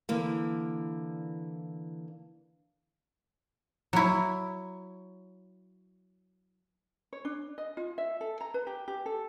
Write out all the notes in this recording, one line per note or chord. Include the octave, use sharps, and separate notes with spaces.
D3 E3 A#3
F#3 E4
C#5
D4
D#5
F4
E5
A4
A#5
B4
G4
G4
A4